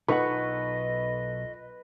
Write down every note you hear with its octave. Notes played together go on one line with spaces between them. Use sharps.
B1 D#4 F4 A4 B4 D#5 F#5 C#6